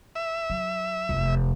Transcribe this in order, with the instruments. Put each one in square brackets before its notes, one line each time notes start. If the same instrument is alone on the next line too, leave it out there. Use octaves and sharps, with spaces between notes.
[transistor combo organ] E5
[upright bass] F#3
F1 E2